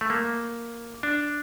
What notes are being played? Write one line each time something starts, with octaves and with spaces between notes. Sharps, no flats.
A3
A#3
D4